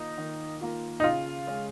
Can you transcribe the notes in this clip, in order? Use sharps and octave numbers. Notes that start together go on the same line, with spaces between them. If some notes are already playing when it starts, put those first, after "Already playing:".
Already playing: D#3 A#3 D#4 F4
D#3
A#3 F4
D#4
C#3 F4
G#3 C#4